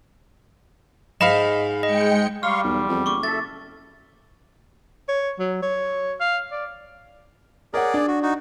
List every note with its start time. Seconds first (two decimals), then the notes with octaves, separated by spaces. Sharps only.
1.21 G#2 D#5 F5 B5 E7
1.83 G#3 D#5 G5 C#7
2.43 G3 F5 C6 C#6 F6
2.64 B1 E2
2.88 F2
3.06 F#1 C#6 D6
3.23 A4 E5 A6
5.09 C#5
5.40 F#3
5.63 C#5
6.21 F5
6.52 D5
7.74 G#4 A#4 C#5 D5 F#5
7.94 D4
8.07 F#4
8.23 D#4 F#4